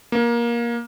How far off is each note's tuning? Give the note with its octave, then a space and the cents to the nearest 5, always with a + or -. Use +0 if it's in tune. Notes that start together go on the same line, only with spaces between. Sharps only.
A#3 +20